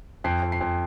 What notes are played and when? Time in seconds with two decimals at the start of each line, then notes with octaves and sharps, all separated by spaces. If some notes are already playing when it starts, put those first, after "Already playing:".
0.24 F2 C7
0.43 F2
0.52 C7
0.61 F2